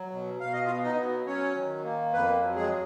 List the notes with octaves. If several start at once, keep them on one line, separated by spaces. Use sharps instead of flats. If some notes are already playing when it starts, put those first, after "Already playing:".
Already playing: F#3
B2
B2 F5
D#5
F4 F5
B3
D#4 D#5
F#3
F#3 C#4 C#5
D#3
A#3
F2 B3 B4
F#3
G#3 G#4